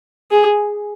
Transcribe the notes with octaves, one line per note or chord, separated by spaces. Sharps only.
G#4